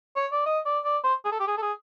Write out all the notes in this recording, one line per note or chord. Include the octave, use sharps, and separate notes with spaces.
C#5
D5
D#5
D5
D5
C5
G#4
A4
G4
G#4
A4
G#4